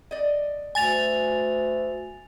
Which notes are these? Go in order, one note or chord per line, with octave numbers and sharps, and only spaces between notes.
D5 D#5
D2 G#5 A6 F7